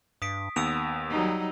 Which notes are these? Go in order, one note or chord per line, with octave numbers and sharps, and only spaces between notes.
G2 D#6 B6 D7
D#2 B3 E6 D7 F7
F#3 G3 D#4